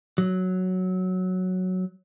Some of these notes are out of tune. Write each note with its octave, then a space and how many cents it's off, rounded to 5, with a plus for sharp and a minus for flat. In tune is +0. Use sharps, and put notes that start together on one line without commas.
F#3 +0